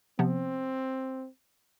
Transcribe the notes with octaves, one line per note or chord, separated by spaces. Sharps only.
C3 F3 B3 C4